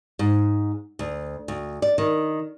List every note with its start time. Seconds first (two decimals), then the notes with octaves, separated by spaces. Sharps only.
0.19 G#2
0.99 D2
1.48 D2
1.82 D5
1.98 D#3